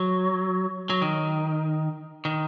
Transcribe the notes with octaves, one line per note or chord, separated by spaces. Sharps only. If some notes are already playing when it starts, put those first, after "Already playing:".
Already playing: F#3
F#3
D#3
D#3